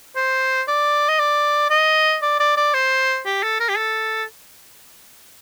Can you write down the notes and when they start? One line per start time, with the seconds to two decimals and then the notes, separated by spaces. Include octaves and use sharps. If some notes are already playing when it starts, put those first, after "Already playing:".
0.16 C5
0.68 D5
1.08 D#5
1.19 D5
1.70 D#5
2.22 D5
2.39 D5
2.57 D5
2.74 C5
3.26 G4
3.43 A4
3.60 A#4
3.69 G4
3.77 A4